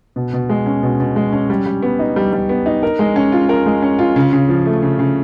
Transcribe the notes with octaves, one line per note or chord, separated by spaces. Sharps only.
B2
B2
G#3
C#4
B2
B2
G#3
C#4
G3
G3
B3
D#4
G3
G3
B3
D#4
A#4
G#3
C#4
F4
A#4
G#3
C#4
F4
C#3
C#3
F3
A3
C#3
C#3